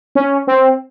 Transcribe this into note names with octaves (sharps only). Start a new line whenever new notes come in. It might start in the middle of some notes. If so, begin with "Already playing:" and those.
C#4
C4